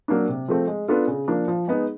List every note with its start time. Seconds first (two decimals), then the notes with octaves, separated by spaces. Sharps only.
0.08 F#3 A#3 D4
0.28 C3
0.48 F3 A3 C4
0.67 G#3
0.88 B3 D4 F4 A4
1.07 C#3
1.28 F3 A#3 D4
1.48 F3
1.68 G#3 B3 D#4